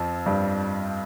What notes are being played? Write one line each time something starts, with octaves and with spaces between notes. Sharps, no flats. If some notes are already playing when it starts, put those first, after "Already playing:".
Already playing: F2 F3
G2 G3